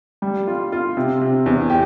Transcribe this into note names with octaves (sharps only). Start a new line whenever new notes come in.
G3
F4
F4
C3
C3
E2
G4